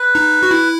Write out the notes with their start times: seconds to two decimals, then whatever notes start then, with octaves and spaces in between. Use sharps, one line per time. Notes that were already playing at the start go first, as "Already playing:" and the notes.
Already playing: B4
0.15 D#4
0.43 F#4
0.51 E4